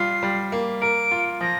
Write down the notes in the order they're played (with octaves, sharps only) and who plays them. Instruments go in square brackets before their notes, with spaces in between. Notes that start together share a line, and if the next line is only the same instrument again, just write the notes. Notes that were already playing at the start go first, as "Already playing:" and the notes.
Already playing: [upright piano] G3 F4 [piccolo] C7
[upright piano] G3
A#3
[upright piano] A#4 [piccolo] D7
[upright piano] F4
[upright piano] F3 [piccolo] A#6